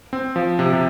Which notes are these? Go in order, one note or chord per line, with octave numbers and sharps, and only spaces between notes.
C4
F3
C3
C3